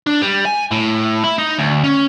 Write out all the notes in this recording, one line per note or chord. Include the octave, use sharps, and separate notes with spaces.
D4
G3
G#5
A2
E4
D#4
D2
C#4